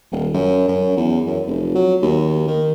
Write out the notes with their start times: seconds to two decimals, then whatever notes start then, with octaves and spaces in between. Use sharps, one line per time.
0.12 D#1
0.34 F#2
0.68 F#2
0.97 E2
1.26 F#2
1.47 F1
1.75 F#3
2.02 D#2
2.48 D#3